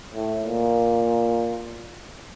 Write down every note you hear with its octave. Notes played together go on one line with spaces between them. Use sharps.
A2
A#2